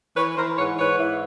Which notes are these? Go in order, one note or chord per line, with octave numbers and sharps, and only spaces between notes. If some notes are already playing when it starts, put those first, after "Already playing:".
E3 B4 C#5
E3 A#4 C5
G#2 B4 C#5
G#2 B4 C#5
E3